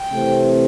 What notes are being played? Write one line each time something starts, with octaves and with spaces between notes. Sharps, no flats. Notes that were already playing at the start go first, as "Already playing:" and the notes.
Already playing: G5
C3 E3 A3 C4